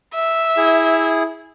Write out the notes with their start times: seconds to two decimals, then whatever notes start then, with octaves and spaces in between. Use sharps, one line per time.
0.14 E5
0.57 E4 G#4